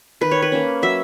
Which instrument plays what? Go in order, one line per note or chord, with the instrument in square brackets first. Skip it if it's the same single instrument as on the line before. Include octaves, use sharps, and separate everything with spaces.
[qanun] D#3 B4
C#5
B4
A#3 C#4
F#3 E5